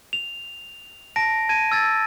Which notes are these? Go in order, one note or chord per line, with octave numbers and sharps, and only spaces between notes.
F7
A5 A#6 D7
A5 G#6 D#7
E6 G#6 A6